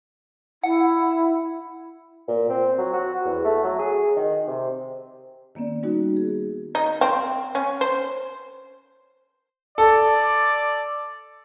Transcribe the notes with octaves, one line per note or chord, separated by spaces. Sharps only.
E4 F#5
A#2
C4
F#3
F#4
E2
A3
F#3
G#4
D#3
C3
D#3 A#3 B3 C#4 D5
G3 A#3 D#4 F#4
G#4
D#4
C4
C#4
C5
A4 D5